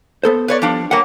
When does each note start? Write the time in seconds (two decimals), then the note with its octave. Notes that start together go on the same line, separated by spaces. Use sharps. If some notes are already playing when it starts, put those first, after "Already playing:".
0.24 B3 A4 C5
0.48 B4 C#5 D5
0.62 F3 G3 D4
0.91 G3 A#3 C#5 F#5